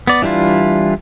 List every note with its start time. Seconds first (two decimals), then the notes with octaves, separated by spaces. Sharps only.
0.07 B3 D5
0.22 E3 G3 D4 E4 F4